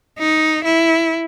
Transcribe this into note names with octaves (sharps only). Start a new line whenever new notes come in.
D#4
E4